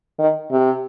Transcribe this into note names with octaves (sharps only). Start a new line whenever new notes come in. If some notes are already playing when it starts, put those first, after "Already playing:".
D#3
C3